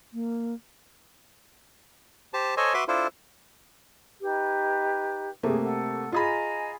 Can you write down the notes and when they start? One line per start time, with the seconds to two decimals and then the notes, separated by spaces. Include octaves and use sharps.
0.13 A#3
2.33 G4 C5 A5
2.57 A4 C5 C#5 D#5 G#5
2.74 F#4 B4 E5 C6 D6
2.88 D4 E4 F4 A4 C5
4.21 D#4 G4 B4
5.43 C3 A3 A#3 G#4
5.64 A4 F#5
6.12 F4 G#4 D#5 G#5 A#5 B5